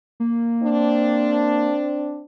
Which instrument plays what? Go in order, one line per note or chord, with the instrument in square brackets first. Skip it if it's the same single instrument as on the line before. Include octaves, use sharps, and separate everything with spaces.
[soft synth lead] A#3
[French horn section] C4 D4